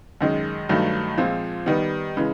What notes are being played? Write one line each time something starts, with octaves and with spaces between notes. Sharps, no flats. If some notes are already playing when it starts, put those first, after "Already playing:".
F#2 D#3 G#3
G2 D#3 F#3 A3
A#2 F3 G#3 C4
D#3 G3 B3
C#3 E3 G#3